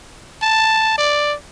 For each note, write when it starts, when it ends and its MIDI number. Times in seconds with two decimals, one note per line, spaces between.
0.43 0.97 81
0.98 1.35 74